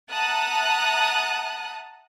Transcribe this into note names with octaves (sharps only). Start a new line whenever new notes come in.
E5 F#5 A5 A#5 D#6 F#6